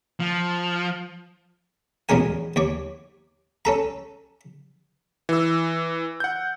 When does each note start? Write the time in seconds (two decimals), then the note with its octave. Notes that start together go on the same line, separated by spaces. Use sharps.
0.20 F3
2.09 E2 B2 G#3 C#4 A#4 G#5
2.56 D#2 C#5 D6
3.65 C#4 A4 A#5
5.29 E3 E6
6.20 F#5 G6